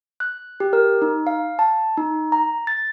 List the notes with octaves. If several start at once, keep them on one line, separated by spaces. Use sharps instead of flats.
F#6
G4
A#4
D#4
F5
A5
D#4
A#5
A6